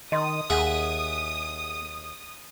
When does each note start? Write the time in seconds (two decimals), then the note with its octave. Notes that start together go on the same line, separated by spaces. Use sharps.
0.12 D#3 D#5 C6 D#6
0.50 D#2 G#4 E5 F#5